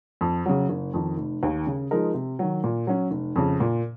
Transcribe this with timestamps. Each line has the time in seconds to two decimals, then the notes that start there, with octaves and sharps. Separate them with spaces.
0.21 F2
0.46 C#3 F#3
0.69 F#1
0.94 F2 D#3
1.18 F1
1.43 D#2 D#3
1.67 C#3
1.91 F3 G#3 D#4 A#4
2.14 C3
2.39 D#3 F#3
2.64 A#2
2.87 F#3 C#4
3.11 F1
3.36 F2 C#3
3.60 A#2